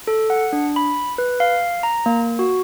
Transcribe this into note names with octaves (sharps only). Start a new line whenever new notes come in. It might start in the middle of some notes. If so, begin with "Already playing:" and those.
A4
F#5
D4
B5
B4
F5
A#5
A#3
F#4